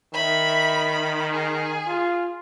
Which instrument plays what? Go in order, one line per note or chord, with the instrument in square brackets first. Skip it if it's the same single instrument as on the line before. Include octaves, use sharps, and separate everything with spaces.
[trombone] D#3 [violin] E5 B5
[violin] B5
G#4
[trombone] F4